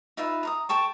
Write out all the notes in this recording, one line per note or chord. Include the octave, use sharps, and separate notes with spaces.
D#4 F4 B4 E5
A#5 C6 D#6
A4 G5 A5 C#6